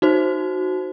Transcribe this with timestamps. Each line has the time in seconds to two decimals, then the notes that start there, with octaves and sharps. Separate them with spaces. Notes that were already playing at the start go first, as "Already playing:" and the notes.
0.02 D#4 F#4 C5